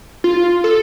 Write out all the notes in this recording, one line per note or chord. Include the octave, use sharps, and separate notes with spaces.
F4
A4